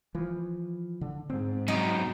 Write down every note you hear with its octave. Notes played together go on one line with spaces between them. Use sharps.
E3 F3
D3
G#2 C4
F#2 B2 D#4